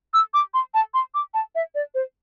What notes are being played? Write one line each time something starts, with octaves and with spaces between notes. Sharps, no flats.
E6
D6
C6
A5
C6
D6
A5
E5
D5
C5